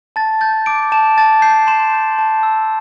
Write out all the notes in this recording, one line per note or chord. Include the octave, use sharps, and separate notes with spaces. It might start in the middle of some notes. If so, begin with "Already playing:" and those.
A5 A6
G6 A6
D6 D7
A5 E7
A5 A6
G6 C7
C6 E7
G6
A5
E6